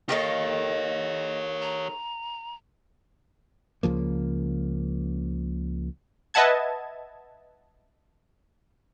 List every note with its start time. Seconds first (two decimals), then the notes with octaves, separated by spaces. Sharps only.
0.09 D#3 A#3 G4 A4 C#5 D#5
1.62 A#5
3.83 C#2 C#3 F3 A#3
6.34 B4 D#5 E5 F#5 A5 G#6